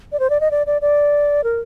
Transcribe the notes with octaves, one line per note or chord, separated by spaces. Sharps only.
D5
C5
D5
D#5
D5
D5
D5
A#4